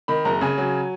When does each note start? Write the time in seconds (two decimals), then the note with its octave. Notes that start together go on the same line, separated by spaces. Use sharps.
0.08 D#3 B5
0.25 F#1 A#5
0.41 C#3 G#5
0.58 F#3